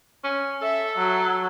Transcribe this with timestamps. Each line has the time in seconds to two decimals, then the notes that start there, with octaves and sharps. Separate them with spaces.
0.24 C#4
0.62 A4 E5
0.97 F#3